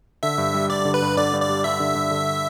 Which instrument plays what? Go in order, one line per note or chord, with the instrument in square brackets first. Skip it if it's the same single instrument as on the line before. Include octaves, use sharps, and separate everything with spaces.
[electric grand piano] D3 [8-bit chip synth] E5
[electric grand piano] G2
G3
[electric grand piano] G2 [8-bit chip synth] D5
[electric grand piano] D3
[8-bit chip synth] B4
[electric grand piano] G2
[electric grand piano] D3 [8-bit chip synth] D5
[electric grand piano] G2
[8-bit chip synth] D5
[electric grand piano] G3
[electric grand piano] G2 [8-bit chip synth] E5
[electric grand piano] D3
G2
D3